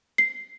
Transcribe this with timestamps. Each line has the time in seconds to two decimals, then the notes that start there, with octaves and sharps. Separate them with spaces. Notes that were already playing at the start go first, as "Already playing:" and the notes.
0.18 C7